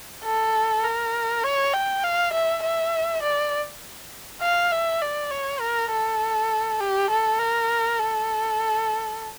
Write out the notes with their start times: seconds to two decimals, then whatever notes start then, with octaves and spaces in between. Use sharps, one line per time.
0.24 A4
0.84 A#4
1.44 C#5
1.73 G5
2.04 F5
2.33 E5
2.63 E5
3.23 D5
4.42 F5
4.72 E5
5.02 D5
5.31 C#5
5.60 A#4
5.91 A4
6.80 G4
7.10 A4
7.39 A#4
7.99 A4